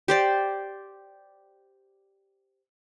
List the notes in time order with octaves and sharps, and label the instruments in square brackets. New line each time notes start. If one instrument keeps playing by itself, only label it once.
[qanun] G4 C5 D5